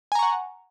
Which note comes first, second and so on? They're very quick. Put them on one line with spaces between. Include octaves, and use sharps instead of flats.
G#5 A#5 C#6 F#5